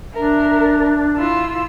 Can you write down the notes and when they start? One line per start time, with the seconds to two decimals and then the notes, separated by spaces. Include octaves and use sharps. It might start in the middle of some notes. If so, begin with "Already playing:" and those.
0.14 D4 A#4 E5
1.18 E4 F4 E6